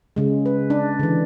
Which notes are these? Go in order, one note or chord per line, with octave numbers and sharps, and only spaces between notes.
C#3 G#3
B4
D4
D3 E3